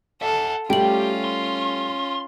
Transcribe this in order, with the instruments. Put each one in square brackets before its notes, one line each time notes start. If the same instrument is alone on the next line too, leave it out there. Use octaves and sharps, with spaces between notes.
[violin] A4 [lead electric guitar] E5 F#5
[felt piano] G3 A3 [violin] C#4 F4 [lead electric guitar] G4 [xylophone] G5 F#7
[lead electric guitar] C6